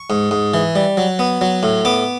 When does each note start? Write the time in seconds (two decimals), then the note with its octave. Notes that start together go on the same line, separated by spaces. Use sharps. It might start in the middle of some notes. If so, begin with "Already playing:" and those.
Already playing: C#6
0.10 G#2
0.31 G#2
0.54 E3
0.75 G3
0.97 F#3
1.19 B3
1.41 F#3
1.63 A2
1.85 B3 D6